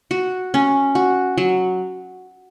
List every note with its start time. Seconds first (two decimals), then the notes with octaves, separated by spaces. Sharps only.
0.11 F#4
0.54 C#4
0.95 F#4
1.38 F#3